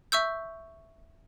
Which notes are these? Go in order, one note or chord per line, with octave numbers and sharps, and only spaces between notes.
E5 C#6 E6 G6